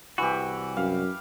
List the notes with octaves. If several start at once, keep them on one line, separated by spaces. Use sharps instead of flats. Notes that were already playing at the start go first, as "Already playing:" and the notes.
C2 E3 F#4 G4
F#2 F5